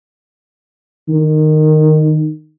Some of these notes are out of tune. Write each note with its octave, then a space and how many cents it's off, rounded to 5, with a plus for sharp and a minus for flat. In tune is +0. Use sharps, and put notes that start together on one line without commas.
D#3 -15